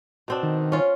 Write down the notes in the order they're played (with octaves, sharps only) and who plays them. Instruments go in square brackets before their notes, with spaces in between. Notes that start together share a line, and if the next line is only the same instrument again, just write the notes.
[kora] B2 C4 D4
[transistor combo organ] D#3
[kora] C#4 F4